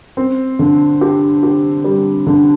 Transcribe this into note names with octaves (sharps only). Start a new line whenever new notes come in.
C4
D3
G4
G4
G3
D3